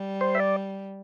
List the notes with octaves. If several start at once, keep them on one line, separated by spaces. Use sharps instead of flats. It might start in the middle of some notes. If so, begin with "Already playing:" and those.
Already playing: G3
C5
E5
D5